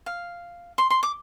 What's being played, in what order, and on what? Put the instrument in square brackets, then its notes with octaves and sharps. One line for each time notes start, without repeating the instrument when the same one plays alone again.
[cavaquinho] F5
C6
C6
D6